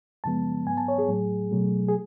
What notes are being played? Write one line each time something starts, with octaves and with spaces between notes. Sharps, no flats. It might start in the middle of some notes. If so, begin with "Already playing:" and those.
F#2 C#3 F3 G#3 B3 A5
G#2 F#3 B3 G#5
A5
C#5
G#4
A2 F#3 A3
B2 F#3 A3
G#4